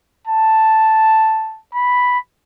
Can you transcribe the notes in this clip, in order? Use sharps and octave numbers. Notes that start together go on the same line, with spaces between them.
A5
B5